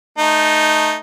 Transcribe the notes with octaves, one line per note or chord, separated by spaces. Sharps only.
A3 D#4